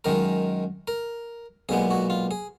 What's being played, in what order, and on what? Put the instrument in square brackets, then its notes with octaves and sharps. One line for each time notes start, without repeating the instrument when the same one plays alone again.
[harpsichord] F#2 D#3 G#3 A#4
A#4
B1 A#2 G#3 B3 G#4
F#4
F4
G#4